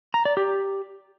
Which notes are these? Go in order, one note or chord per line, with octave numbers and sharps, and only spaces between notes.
A#5
D5
G4